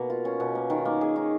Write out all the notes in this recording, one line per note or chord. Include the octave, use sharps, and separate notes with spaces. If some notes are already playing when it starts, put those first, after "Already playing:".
Already playing: B2 A#3
F4
C#4
B2
A#3
D#3
A#3
G#4
D#4